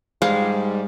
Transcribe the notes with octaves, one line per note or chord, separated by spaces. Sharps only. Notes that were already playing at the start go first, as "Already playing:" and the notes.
G#2 G3 G#3 F5